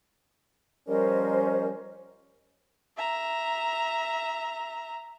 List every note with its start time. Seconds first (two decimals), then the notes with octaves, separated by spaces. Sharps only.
0.88 F3 G3 C#4 A#4 C5 D#5
2.97 E5 A#5